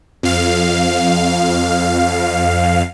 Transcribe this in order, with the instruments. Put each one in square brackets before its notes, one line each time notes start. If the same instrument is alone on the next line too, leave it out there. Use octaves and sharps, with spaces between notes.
[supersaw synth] F2 F5